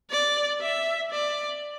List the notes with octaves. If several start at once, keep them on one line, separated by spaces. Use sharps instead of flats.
D5
E5
D5